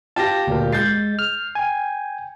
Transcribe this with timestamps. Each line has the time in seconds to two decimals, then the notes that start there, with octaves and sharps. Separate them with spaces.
0.16 F4 G4 A5 A#6
0.47 D2 A#2 A#4
0.72 G#3 G6 A6 C7
1.19 F6
1.55 G5 G#5